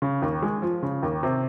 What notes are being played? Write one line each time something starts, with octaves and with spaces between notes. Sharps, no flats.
C#3
D#2
G#3
F3
C#3
D#2
C3